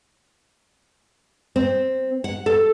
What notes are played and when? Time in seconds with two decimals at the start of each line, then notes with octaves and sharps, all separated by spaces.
1.56 C4
2.24 F#5
2.46 A4